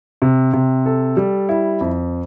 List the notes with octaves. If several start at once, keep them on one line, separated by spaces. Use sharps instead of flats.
C3
C3
A4
G3
E4
F2